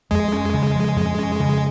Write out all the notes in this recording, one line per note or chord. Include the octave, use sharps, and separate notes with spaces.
F2 G#3
C#4
C#3
F3
F2
C#4
C#3